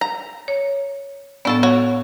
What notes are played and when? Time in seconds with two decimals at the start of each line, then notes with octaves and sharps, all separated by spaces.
0.01 A#5
0.48 C#5
1.45 A2 B3 D4 A4 A5
1.63 F#4 C#5